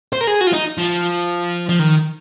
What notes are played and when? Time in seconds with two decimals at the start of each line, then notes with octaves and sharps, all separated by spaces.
0.13 C5
0.21 A#4
0.27 G#4
0.41 F#4
0.47 F4
0.53 D#4
0.78 F3
1.69 F3
1.79 D#3